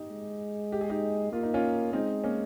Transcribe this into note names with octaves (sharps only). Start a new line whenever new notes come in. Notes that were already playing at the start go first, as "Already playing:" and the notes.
Already playing: D#4 G4
G#3
G4
G#4
D#4 G4
A#3 F4
D#4
C#4 F4
G#3 C4 D#4
A#3 C#4